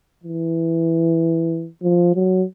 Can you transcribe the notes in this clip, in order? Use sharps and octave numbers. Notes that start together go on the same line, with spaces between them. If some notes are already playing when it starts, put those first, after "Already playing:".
E3
F3
F#3